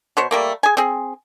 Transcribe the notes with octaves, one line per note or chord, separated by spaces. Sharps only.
B2 C5 C#5
G3 A3 A#3
G#4 G#5
C4 G#4